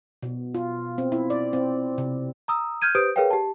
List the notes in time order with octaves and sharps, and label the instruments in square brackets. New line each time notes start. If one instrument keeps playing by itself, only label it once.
[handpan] B2
F4
C4
E4
D5
C4
C3
[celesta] A#5 D#6 E6
F6 G6 G#6 D#7
G4 B4 C5 D#6 G6 D7
G#4 A#4 B4 C#5 F5 G5
G4 A5